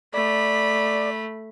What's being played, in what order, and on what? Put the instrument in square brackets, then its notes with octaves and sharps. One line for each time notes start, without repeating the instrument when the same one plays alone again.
[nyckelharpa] A3 [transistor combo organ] D5 [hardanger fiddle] B5